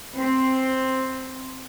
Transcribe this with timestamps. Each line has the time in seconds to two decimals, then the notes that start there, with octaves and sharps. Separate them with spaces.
0.17 C4